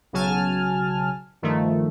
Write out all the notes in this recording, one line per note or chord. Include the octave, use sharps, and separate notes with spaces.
B1 C#3 F#3 G#5 A5 F6
G2 D#3 F3 A3